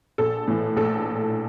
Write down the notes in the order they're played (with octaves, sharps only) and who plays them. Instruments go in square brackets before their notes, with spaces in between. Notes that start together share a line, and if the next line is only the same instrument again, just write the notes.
[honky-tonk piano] A#1 A4
A2 E3
A#1 A4